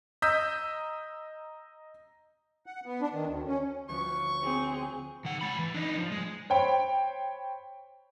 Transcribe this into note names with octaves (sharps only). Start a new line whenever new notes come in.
D#5 A#5 D#6 E6 G6 B6
F#5
B3
D4
D#3
D2
C#4
D2 F3 C#4 C#6
C4 G#4
D#3 F#5
G#3 B5
E3
D4 D#4
F3
G#3
C5 C#5 G5 B5